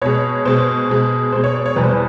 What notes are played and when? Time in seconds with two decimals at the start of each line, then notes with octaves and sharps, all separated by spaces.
0.02 B2 G#3 C#5
0.45 B2 G#3 C5
0.89 B2 G#3
1.32 B2 G#3 C5
1.44 C#5
1.54 D5
1.66 C#5
1.76 E2 B2 G3 B4
1.83 C5
1.91 B4